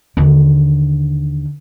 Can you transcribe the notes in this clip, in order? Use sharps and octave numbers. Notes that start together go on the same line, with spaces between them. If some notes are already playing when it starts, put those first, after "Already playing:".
D#2 D3